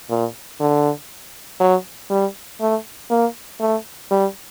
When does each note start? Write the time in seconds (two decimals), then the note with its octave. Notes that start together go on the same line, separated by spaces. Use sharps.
0.10 A#2
0.60 D3
1.60 F#3
2.10 G3
2.61 A3
3.11 A#3
3.61 A3
4.11 G3